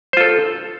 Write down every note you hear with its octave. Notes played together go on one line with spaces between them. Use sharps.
F4 A4 C5